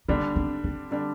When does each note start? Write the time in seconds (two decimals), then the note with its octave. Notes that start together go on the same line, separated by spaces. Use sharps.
0.08 D3 G3 A#3 D4
0.36 C4
0.64 C4
0.91 D3 G3 D4